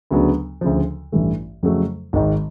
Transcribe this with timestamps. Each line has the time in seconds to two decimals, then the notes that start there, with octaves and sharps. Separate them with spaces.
0.11 D2 C#3 F#3 B3 D4
0.61 D2 C#3 F3
1.12 A1 G2 E3 A3
1.63 F2 C#3 F#3 A3
2.13 G#1 G#2 D#3